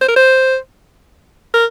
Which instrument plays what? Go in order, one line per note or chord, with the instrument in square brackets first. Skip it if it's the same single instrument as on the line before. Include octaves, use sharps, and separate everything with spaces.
[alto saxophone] C5
A#4
C5
A#4